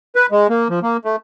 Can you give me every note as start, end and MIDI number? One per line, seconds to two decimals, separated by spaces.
0.16 0.26 71
0.32 0.47 56
0.50 0.68 58
0.70 0.79 53
0.83 0.97 58
1.05 1.16 57